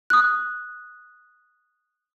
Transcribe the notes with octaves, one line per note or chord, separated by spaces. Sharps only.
D#6 F#6